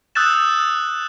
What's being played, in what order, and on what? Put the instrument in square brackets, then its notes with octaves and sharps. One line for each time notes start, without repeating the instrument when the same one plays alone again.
[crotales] D#6 E6 F#6 G6 A6 E7